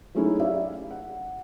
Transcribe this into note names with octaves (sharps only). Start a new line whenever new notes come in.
F#3 G#3 A3 C#4 D#4 E4
G4 D5 E5 F5
F#5